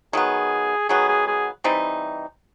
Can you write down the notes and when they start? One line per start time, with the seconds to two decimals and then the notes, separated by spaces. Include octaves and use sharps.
0.13 D#3 F#3 B3 G#4
0.89 D#3 F#3 B3 G#4
1.08 G#4
1.27 G#4
1.64 E3 G3 C4 D#4